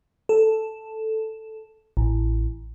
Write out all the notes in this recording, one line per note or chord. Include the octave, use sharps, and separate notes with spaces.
A4
A1